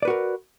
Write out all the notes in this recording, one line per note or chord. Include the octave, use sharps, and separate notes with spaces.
F#4 A#4 B4 D5